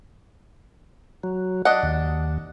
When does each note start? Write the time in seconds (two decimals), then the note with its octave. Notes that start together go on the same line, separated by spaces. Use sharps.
1.23 F#3
1.65 D4 D#5 F#5
1.83 D#2